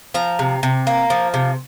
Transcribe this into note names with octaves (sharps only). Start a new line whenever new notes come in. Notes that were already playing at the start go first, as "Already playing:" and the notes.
F3 A#5
C3
C3
A#3
F3
C3